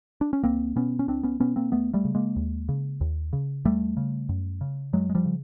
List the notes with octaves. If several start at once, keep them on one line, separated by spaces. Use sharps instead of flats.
D4
C#4
C#2 A#3 C4
B2 B3 C#4
C#4
C#2 C4 D4
B3 C#4
B2 B3 C#4
A#3 C4
D#2 A3 B3
G3 A3
C#3
G#3 A#3
D#2
C#3
D#2
C#3
D#2 G3 A3
C#3
F#2
C#3
F#2 F#3 G#3
G#3
F3 G3
C#3